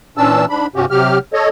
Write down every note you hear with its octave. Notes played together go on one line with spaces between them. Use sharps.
A#2 E3 C#4 D4 A5 E6
G#2 D4 B5
G2 C3 C#4 F#4 G4
C3 F#3 G4 F6
A4 C#5 D#5